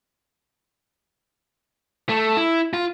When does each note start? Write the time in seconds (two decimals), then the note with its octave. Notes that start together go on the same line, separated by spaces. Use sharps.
2.09 A3
2.37 E4
2.73 F4